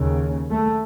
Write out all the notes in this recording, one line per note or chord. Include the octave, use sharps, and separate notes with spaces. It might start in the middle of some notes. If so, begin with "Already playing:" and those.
Already playing: D#2 C#3
A3